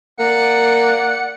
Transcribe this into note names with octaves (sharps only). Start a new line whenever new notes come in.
A#3 D5 F#5 C#7